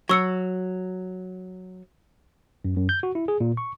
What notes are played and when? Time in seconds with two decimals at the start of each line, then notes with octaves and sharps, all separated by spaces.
0.09 F#3 C#6 E6 C#7
2.65 F#2
2.77 F#2
2.89 G6
3.03 F#4
3.15 E4
3.28 G#4
3.40 A#2
3.57 C#6